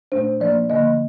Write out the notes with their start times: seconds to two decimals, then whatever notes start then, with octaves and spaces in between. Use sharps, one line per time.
0.12 A#2 A3 D4 C5
0.40 F3 A#3 D4 D5
0.70 D3 F3 A#3 D#5